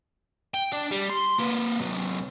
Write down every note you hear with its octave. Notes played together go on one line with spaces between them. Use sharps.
G5
D4
G3
C6
A#3 B4
C3 F#3